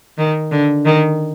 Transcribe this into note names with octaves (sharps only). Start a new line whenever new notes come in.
D#3
D3
D#3